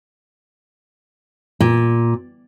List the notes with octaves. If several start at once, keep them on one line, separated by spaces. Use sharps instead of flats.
A#2